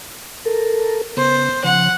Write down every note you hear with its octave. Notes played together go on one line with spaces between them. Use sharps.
A4 A#4
C#3 B3 C5
C#3 F3 F#5